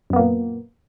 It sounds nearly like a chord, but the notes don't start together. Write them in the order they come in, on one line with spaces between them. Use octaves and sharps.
F#2 B3 A#3 A#2